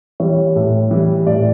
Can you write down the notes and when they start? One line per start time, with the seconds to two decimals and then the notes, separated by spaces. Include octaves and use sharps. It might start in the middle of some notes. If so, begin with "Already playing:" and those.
0.20 E3 G3 C#5
0.56 A2
0.91 E3 G3
1.27 A2 D5